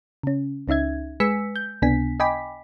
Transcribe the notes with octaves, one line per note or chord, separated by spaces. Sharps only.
C#3 C#4
C#2 C#4 D#4 E5 G#6
G#3 B4 G#5 E6 B6 C#7
G6
C#2 C3 B3 D4 G#5 B6
D#5 G5 G#5 B5 D6 B6